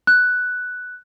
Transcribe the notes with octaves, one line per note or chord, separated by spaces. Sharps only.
F#6